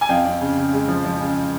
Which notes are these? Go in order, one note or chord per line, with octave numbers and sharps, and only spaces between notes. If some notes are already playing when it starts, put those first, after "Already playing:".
G#5
F2 F5 G5
F2
C#3
C#3
G#3
F3
F3
C#3